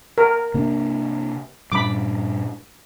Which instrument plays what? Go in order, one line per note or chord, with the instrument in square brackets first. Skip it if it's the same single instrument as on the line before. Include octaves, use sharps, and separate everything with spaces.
[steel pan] A#4
[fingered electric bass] C3 A#3 D4
[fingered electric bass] G2 A#2 G3 [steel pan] B5 D6